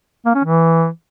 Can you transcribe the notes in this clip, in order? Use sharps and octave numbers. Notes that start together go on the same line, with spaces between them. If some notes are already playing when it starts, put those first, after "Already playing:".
A#3
C#4
E3